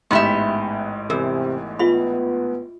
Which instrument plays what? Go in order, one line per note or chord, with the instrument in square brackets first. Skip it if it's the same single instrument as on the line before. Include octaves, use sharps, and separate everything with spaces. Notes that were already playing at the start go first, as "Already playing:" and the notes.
[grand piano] A1 G#2 [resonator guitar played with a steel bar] B3 G4 E5 [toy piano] C6
[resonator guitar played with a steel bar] E2 [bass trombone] C3 [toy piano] A#4 E6
[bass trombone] B3 [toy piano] F4 E5 B5